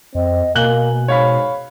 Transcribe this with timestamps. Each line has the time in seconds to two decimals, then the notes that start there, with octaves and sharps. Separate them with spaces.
0.15 F2 C4 D#5
0.56 B2 A#3 G#5 F#6 F#7 G7
1.08 G#2 C#5 F5 B5